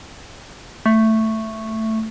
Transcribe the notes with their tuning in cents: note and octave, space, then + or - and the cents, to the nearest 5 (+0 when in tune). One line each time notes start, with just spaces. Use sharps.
A3 +5